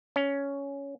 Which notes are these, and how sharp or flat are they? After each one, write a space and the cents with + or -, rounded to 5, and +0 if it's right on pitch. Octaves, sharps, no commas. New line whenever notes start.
C#4 +10